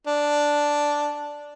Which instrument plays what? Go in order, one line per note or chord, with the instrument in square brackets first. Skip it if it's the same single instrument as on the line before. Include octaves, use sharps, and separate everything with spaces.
[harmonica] D4